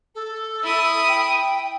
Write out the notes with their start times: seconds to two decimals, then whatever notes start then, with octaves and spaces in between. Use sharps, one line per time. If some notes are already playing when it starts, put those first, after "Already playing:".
0.14 A4
0.63 E4 D#6
1.08 G5